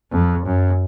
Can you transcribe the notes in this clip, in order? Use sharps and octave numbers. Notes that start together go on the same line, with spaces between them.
F2
F#2